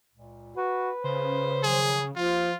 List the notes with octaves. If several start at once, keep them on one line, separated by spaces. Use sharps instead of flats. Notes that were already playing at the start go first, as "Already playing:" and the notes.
C#2 A#2
F#4 B4
C#3 C5
D#3 F3 F#3 G#4
D#2 F3 F4